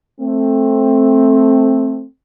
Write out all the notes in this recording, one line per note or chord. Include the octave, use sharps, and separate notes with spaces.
A3 C4